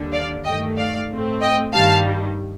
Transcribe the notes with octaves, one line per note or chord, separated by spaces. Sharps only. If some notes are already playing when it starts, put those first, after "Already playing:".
Already playing: D#2 D3 G3 D4
D5 F5
G2 D#3 A3 D#5 G5
D5 F5
A2 A3 C4
D#5 G5
G2 D#3 G3 F5 A5